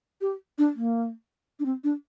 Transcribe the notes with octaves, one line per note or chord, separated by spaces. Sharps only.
G4
D4
A#3
D4
C4
D4